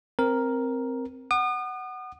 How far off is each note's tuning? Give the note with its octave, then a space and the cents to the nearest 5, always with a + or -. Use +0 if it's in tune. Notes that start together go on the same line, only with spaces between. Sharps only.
C4 +0 A#4 +5
F#5 +10 D#6 -40